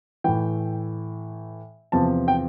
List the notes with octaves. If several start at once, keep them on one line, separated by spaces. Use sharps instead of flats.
A2 E3 G5
E2 C3 F3 A5
G5